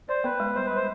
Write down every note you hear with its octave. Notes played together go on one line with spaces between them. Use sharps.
C5 D5
B3 B4
G#3
G3 C5
G3 B4
C5